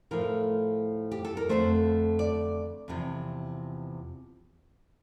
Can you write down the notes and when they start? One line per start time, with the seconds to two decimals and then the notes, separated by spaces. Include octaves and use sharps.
0.11 A2 F3 A3 A#4
1.11 G4
1.25 A4
1.37 A#4
1.49 F2 D3 A3 C5
2.19 D5
2.88 E2 C3 F3